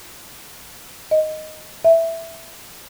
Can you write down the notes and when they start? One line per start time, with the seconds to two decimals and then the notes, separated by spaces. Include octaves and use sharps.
1.11 D#5
1.85 E5